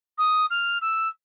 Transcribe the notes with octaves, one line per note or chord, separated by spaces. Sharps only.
D#6
F6
E6